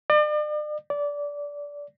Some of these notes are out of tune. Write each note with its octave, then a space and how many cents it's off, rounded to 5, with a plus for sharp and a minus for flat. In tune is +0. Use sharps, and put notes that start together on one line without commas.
D5 +40
D5 -20